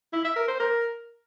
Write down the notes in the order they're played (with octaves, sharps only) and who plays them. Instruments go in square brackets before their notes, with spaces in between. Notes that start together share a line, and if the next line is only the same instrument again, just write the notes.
[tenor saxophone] E4
E5
A#4
C5
A#4